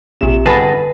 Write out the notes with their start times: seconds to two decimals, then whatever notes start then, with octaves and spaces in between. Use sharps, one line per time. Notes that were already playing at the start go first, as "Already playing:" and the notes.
0.21 A#1 C3 E7
0.46 G1 G#4 B4 A5 B5 A6 A#6